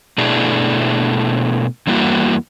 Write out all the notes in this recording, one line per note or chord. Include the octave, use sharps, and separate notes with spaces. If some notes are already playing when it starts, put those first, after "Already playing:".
B2 A3 D4 E4 G#4
E2 G3 A#3 E4 F#4